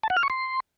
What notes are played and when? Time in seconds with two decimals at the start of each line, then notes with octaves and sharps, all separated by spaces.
0.03 A5
0.10 F#5
0.17 F6
0.23 C#6
0.30 C6